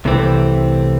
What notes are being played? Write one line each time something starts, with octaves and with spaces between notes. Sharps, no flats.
C2 C3 E3 A3 C4